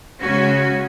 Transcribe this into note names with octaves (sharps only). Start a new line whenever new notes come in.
C#3 G#3 C#4 F#4